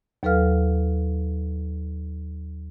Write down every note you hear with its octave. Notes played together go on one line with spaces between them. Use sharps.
D#2 F#3 A4 B4 F5 F6